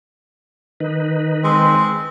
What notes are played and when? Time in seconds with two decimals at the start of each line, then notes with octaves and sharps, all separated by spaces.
0.80 D#3 D#4 B4
1.44 G#3 C4